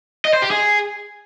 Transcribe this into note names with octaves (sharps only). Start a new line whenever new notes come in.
D#5
C5
G4
G#4